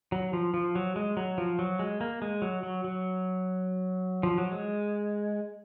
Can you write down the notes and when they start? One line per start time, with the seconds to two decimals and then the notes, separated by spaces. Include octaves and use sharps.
0.12 F#3
0.33 F3
0.54 F3
0.75 F#3
0.96 G#3
1.17 F#3
1.38 F3
1.59 F#3
1.79 G#3
2.01 A#3
2.22 G#3
2.42 F#3
2.63 F#3
2.84 F#3
4.23 F3
4.38 F#3
4.52 G#3